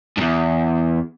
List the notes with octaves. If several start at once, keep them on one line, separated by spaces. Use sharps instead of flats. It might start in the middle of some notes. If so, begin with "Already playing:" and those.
E2 G2